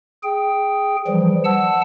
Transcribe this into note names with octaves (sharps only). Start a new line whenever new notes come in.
G#4 G5
E3 F3 G3
F#5 A5 E6